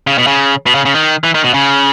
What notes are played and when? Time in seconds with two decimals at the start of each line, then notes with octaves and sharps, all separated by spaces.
0.07 C#3
0.18 B2
0.27 C#3
0.66 B2
0.75 C#3
0.85 C#3
0.94 D#3
1.24 E3
1.34 D#3
1.44 B2
1.54 C#3